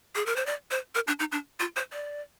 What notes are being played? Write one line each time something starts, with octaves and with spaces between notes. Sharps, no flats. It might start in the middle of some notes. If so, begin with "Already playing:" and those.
G#4
A#4
C5
D5
C5
A#4
D4
D#4
D4
F4
C5
D5